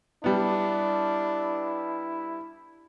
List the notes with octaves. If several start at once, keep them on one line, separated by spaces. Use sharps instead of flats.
G3 B3 D4 E4